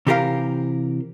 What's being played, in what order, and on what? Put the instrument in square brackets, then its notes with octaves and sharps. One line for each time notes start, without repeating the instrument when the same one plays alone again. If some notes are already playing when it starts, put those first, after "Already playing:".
[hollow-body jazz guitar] C3 E3 G4 A4 A#4 F5